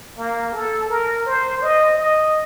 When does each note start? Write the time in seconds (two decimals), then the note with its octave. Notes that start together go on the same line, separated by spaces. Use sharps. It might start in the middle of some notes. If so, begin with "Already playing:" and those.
0.18 A#3
0.53 A4
0.89 A#4
1.26 C5
1.62 D#5
1.98 D#5